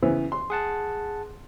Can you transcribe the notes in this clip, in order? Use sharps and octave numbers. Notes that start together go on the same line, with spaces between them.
C#3 E3 B3
C6
G#4 F#5 A5